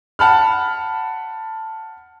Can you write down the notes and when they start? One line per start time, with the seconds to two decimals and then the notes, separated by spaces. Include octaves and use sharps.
0.19 F#5 A5 B5 F6